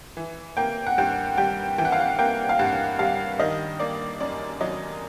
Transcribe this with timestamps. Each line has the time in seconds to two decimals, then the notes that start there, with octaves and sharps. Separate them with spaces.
0.17 E3
0.57 A#3 G5
0.87 F#5
0.98 G2 G5
1.38 G3 G5
1.78 E3 G5
1.85 F#5
1.92 F5
2.00 F#5
2.19 A#3 G5
2.49 F5
2.59 G2 F#5
2.99 G3 F5
3.39 D#3 D#5
3.79 A#3 D5
4.20 F#2 D5
4.61 F#3 D#5